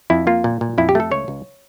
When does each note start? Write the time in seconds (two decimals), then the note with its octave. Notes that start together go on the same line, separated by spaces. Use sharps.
0.10 F2 E4
0.27 A#3 F4
0.44 A#2
0.61 A#2
0.78 F2 E4
0.89 G4
0.95 A3 A4
1.11 C#2 C#5
1.28 C#2